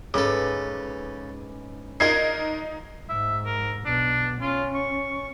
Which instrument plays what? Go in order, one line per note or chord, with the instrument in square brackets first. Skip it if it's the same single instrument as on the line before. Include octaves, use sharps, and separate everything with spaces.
[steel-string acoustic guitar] G#2 C#4 B4 [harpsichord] C#3 A4 [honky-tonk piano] D6
[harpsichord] D4 F4 A#4 [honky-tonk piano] D#4 G#6 C7
[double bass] G#2 [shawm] E5
[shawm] A#4
[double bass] B1 B2 [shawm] D4
[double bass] C#4 [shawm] F4
[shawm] C#6